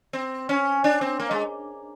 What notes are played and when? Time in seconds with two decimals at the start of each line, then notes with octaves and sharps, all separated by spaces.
0.13 C4
0.49 C#4
0.84 D4
1.01 C4
1.20 A#3
1.31 G#3